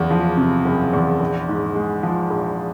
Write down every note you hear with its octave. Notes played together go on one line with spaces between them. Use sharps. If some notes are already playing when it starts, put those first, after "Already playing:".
Already playing: F#1 E2
F3
C3
F#1
E2
A#1
G#2
G#3
F3
A#1